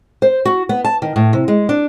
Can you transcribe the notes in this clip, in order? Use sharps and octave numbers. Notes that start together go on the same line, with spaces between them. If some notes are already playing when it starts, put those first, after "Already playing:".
C5
F#4
B3
A5
D#3
A2
C3
G#3
D4